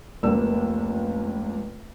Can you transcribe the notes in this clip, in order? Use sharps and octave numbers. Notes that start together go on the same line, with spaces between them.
F1 C#2 A#3 D5 E6